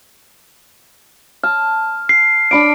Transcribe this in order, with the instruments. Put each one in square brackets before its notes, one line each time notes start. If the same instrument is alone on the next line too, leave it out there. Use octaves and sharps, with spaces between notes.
[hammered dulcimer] A5 [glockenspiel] F6
[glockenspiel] C7
[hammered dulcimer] D4 B5 D6 [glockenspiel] D7